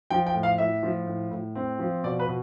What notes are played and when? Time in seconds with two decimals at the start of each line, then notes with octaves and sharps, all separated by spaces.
0.10 F3 G5
0.26 G5
0.34 A2
0.43 F5
0.58 A2 E5
0.83 F3
1.07 A2
1.31 A2
1.55 C4
1.79 F3
2.03 B2 D5
2.19 B4
2.27 B2